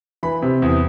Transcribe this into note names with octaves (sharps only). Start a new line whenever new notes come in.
E3 B5
C3
E2